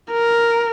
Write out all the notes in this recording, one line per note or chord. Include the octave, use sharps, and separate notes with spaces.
A#4